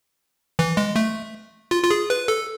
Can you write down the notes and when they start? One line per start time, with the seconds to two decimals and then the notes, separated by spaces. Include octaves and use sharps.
0.59 E3
0.77 G#3
0.96 A3
1.71 F4
1.84 F4
1.90 G#4
2.10 B4
2.28 A4